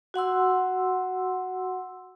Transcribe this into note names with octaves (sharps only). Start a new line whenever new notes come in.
F#4 F#5 C6 E6